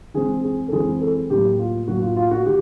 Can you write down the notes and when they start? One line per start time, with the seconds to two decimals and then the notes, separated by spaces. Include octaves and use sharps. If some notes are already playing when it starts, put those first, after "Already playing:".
0.14 E3 G#3 C4 G#4
0.43 G#4
0.68 A4
0.72 E3 G#3 C4 G#4
1.01 A4
1.30 A2 F#3 A#3 G4
1.59 F4
1.88 A2 F#3 A#3 F#4
2.02 F4
2.16 F4
2.31 F#4
2.46 D#3 G4